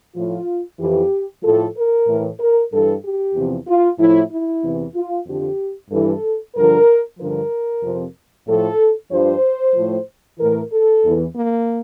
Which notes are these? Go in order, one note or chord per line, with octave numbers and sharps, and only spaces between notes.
A2 F3 F4
F2 E3 G4
A2 F3 A4
A#4
A2 E3
A#4
G2 E3 A4
G4
E2 C3 F3
F4
A2 F3 E4
E4
E2 C3 E3
F4
F2 D3 F3 G4
G2 E3 A4
G2 D3 F3 A#4
G2 D3 F3 A#4
F2 C3 F3
A2 F3 A4
G2 F3 C5
A2 F3
A2 E3 A#4
A4
E2 E3
A#3